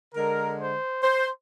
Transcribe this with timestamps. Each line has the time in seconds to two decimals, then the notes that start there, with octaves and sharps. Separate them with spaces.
0.14 D3 G#3 A#4
0.59 C5
1.03 C5